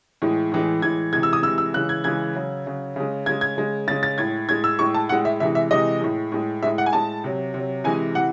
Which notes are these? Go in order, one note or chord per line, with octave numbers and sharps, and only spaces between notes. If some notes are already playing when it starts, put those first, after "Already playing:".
A2 E3 G#3
A2 E3 G#3
A2 E3 G#3 G#6
C3 E3 G#3 G#6
E6
D#6
C3 E3 G#3 E6
E6
C#3 E3 G#3 F#6
G#6
C#3 E3 G#3 G#6
C#3 F#3
C#3 F#3
C#3 G#3
C#3 G#3 G#6
G#6
C#3 G#3
C#3 G#3 A6
A6
A2 G#3 G#6
A2 G#3 G#6
E6
A2 G#3 C#6
A5
A2 G#3 F#5
E5
C3 E3 G#3 E5
E5
C3 E3 G#3 D#5
A2 G#3
A2 G#3
A2 G#3 E5
F#5
G#5
A2 G#3 A5
C3 F#3
C3 F#3
C3 E3 G#3 G#5
C3 E3 F#5